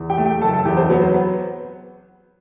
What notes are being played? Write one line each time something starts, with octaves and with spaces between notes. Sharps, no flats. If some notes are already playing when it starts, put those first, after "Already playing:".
Already playing: E2
G4 G5
A3
G4 G5
F#1 A4 A5
A4 A5
E2 G4 G5
C4 C5
F#3 B3 B4
C4 C5
B3 B4